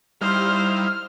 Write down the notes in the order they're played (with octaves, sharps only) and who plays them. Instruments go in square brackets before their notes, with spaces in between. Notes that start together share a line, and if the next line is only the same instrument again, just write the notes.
[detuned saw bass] G3 [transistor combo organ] D#4 E4 F5 [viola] C5 [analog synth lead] F6